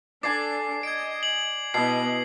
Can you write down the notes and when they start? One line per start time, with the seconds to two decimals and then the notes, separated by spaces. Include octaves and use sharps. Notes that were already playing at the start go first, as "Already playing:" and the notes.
0.23 D4 A4 D5 G#5 D6 C7
0.83 D#5 G#6 D7
1.23 F#7
1.74 B2 B3 E4 D#5 C7